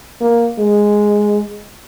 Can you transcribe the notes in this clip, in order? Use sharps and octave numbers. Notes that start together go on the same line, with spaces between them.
A#3
G#3